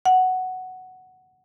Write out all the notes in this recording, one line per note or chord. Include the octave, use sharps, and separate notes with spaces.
F#5